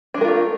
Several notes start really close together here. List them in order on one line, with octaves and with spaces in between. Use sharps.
D4 G#3 A#4 F4 A3